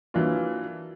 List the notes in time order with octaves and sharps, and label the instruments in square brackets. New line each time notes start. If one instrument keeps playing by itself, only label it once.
[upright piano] E3 F#3 A#3 D4 F4